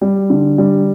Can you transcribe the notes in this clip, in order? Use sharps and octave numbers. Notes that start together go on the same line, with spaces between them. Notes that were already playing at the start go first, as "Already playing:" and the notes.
G3
D3
G3